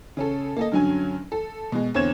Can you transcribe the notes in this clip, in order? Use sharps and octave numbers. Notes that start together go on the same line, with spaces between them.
C#3 C#4 A4
A#3 A4 D#5
G2 D3 F#3 C#4 G#5
A4
B2 G#3
E2 D3 C4 C#5 G#6 E7